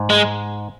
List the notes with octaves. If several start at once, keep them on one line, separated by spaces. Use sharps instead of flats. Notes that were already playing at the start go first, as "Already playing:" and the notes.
Already playing: G#2
G#3